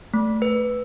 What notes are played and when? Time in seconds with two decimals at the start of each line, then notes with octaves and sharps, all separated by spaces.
0.14 A3
0.42 B4